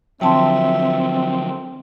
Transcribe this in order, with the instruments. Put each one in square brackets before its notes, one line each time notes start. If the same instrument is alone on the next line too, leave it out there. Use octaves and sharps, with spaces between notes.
[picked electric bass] D3 F3 F#3 [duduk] C4 [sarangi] E5 [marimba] G5 A5 C6